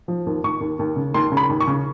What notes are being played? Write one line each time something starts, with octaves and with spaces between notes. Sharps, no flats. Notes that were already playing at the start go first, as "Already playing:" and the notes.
F3
D#2
D#2 C#6
D#2
D#2
C#3
D#2 C6
C#3
B5
D#2
C#6
C#3